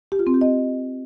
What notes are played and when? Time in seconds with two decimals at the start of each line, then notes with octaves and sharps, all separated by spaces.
0.12 G4
0.19 F4
0.27 C4
0.34 G4
0.41 D#5